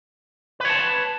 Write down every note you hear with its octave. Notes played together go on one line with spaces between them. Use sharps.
B4 C#5 A5